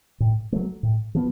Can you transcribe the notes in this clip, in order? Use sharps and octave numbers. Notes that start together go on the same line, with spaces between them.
A2
F#3 A3
A2
F3 B3